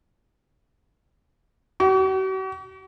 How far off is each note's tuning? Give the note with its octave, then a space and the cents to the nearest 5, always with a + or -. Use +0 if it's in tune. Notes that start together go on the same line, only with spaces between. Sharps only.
F#4 +45